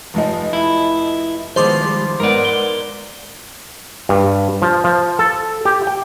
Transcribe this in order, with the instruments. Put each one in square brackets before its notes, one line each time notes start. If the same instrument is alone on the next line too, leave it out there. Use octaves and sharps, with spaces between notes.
[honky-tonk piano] F1 F3 D#4
[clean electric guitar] E4
[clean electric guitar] D#3 F3 [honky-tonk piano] G#3 B3 [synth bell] C5 C6 D6
[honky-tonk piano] G3 G#3
[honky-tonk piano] G#2 B3 F#5 [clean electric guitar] A#4 D5
[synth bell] G7
[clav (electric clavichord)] G2
F3
F3
A4
G4
G5